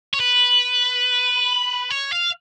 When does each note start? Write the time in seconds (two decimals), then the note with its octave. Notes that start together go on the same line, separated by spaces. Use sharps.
0.14 C#5
0.20 B4
1.91 C#5
2.12 F5